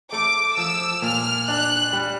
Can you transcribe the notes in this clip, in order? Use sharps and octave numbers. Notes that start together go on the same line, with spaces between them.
A3 D6
F3 E6
A#2 F6
D4 F#6
G3